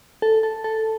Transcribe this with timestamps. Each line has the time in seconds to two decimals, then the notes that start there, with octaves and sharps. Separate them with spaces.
0.22 A4
0.43 A4
0.64 A4